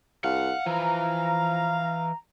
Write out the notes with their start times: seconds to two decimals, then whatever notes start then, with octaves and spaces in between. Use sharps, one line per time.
0.24 C2 F5 F#5
0.66 E3 F3 A#5